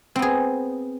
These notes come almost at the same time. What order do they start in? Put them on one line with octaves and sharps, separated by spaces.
C4 B3 G#4